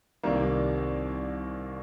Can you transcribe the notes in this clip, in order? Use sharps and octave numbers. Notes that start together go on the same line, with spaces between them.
C2 C3 D#3 G3 A#3